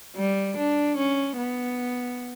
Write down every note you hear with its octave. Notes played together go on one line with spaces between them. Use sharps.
G3
D4
C#4
B3